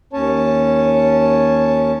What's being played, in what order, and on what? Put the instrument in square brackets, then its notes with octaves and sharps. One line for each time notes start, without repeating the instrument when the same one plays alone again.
[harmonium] D#2 C#4 C#5 A5